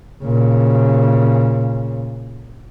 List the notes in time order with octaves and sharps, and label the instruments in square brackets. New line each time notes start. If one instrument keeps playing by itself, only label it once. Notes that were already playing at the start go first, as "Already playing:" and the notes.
[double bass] A#2 C#3